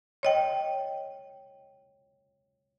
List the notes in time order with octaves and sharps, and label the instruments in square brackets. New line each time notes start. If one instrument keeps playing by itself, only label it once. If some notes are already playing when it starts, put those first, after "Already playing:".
[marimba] C#5 D#5 G5